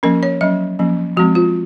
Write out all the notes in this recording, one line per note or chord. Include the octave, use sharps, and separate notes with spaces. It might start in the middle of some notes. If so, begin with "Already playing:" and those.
F3 A#3 C#4 A#4
C#5
F#3 C#4 D#5
F3 A#3 C#4
F3 G#3 C4 F#4
F4